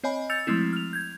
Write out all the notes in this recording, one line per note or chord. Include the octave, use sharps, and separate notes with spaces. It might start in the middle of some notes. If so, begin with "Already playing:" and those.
C4 C#5 D#5 G#5 B5
E6 G6 A6 C#7 F7
F3 G#3 A3 C4 E4
F6 F7
G6 G#6